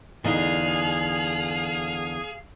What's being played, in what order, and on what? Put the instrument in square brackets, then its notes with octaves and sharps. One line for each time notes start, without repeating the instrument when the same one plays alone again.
[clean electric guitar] E2 [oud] D3 D#4 [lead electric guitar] G#4 [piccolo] F5